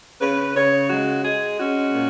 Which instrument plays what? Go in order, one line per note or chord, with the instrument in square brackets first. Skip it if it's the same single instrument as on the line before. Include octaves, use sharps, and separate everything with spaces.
[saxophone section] C#3 B4
C#3 C#5
G#3 F#4
G#3 G#4
C#4 F#4
A#2